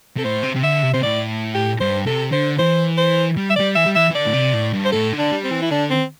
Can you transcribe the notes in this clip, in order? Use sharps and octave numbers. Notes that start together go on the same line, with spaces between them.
C3 A4
A2 C5
C3
C3
D3 E5
C3
C3 C5
A2 D5
G4
G2 C5
C3 A4
D3 C5
E3 C5
C5
G3
E5
G3 D5
E3 E5
G3
E3 E5
E3
D3 D5
A2
C3
A2
G2
C5
A2 A4
D3
D4
G3
C4
E3
E4
D3 D4
C4